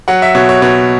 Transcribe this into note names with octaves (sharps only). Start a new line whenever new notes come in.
F#3 F#5
E5
B2 C#5
C#5
B2 C#5